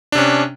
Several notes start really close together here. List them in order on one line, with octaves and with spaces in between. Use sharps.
D4 C3 C#4